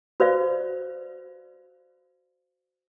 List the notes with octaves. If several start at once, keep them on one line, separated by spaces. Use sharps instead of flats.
F#4 B4 C5 D5 F5